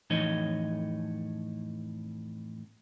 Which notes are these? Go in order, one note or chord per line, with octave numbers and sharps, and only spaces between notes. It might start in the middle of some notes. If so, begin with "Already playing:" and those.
F2 A2 E3 D#4 C#5 D#5